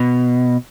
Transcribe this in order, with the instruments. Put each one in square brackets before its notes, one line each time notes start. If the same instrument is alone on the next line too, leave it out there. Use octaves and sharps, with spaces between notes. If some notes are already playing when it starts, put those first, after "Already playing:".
Already playing: [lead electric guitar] B2